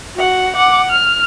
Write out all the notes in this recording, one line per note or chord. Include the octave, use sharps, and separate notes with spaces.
F#4 F#5
F#5 D6
F6